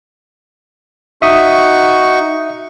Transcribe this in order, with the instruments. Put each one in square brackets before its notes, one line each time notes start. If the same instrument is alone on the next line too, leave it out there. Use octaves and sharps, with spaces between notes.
[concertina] D#4 F#4 C#6 [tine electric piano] E5 D#6